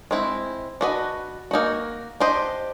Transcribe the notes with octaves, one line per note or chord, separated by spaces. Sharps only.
G#3 C4 E4
D4 F#4 B4 D#5
A#3 D#4 F#4
D4 G4 C5 D#5